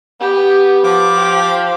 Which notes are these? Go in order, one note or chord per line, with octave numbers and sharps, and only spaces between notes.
B3 G4
F3 D6
G4